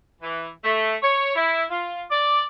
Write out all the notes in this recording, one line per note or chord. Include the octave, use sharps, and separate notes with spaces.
E3
A3
C#5
E4
F4
D5